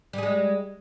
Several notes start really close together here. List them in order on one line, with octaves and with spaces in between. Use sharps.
G3 G#4 G#3